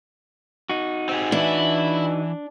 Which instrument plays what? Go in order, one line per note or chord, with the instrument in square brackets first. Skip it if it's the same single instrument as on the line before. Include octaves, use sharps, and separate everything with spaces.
[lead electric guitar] D#4 F#4
[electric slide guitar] C4 G4 G#4
[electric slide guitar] E3 [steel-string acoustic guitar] D4 [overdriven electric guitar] E4